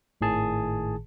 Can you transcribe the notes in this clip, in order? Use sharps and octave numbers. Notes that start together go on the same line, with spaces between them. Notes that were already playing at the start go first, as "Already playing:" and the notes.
G#1 A2 D#3 G#4 A5